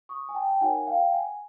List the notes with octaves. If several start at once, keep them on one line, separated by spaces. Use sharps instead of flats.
C#6 D#6
G#5
G5 A5
G5
D#4 F#4 A#4 C#5 F#5 G#5
F5 G5
F#5 G#5